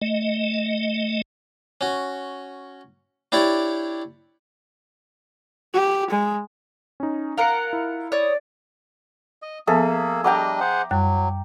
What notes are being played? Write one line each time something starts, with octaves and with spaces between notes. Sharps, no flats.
A3 D#5
C#4 F#4
D4 E4 G4 C#5 D5
G4
G#3
C#4 D#4
F4 A#4 F5 F#5 C#7
E4
C#5 D5 D#6
D#5
F3 A#3 B3 G#4 A4 E5
G3 D4 D#5 G5 A#5 D6
G#4 C5 F#5
F#2 F#3 G3 F#6